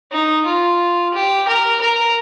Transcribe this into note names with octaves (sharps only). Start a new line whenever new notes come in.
D#4
F4
G4
A#4
A#4